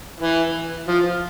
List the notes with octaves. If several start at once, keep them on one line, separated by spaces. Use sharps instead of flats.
E3
F3